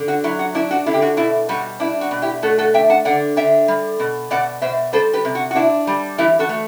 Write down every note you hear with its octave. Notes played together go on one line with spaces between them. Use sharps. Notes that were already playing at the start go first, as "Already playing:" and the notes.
Already playing: D3
F#4
F#3 E4
F#4
D4 E4
F#4
D3 E4
G4
F#4
B2 E4
G3 F#4
D4 E4
F#4
B2
E4 G4
A3 F#4 A4
F#4 A4
D4 E5 G5
F#5 A5
D3 D5 F#5
D3 E5 G5
G3
B2
B2 D5 F#5
B2 C5 E5
G3 A4 C5
G4 B4
C3
F#4
F#4
D4 E4
G3
E3 E4 G4
F#4 A4
A3